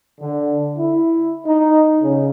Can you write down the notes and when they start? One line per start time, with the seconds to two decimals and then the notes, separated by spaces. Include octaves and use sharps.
0.20 D3
0.76 E4
1.45 D#4
2.01 C#3